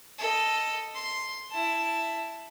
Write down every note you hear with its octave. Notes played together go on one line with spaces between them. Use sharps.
A4 D#5
C6
E4 A5